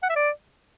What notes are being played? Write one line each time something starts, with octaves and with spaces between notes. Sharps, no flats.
F#5
E5
D5